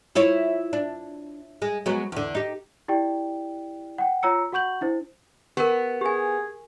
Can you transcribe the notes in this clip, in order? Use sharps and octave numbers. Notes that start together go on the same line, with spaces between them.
E4 F4 C#5
D4
G#3
F#3 G#3 B3
E2 D3
D#4 G4
E4 G4 D5 G5
F#5 G5
F4 C#5 A#5 E6 C#7
F#4 F#5 C#6 G6 F#7
D4 E4 C5
B3 G4 A#4
G4 G#4 G#5